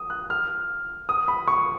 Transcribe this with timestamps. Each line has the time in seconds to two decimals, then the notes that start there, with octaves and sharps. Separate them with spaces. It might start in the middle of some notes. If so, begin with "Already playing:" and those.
Already playing: D#6
0.10 F#6
0.30 F6
1.09 D#6
1.28 B5
1.48 C#6